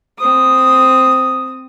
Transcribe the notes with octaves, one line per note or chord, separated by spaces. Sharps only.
C4 D#6